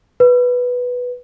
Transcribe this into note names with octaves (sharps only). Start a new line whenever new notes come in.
B4